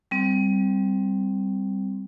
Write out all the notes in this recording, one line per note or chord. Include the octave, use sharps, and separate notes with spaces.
G3 C4